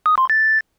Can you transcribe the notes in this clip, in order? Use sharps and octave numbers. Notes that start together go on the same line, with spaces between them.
D#6
C6
A6